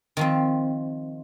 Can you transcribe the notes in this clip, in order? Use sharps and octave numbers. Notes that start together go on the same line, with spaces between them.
D#3 F3 C4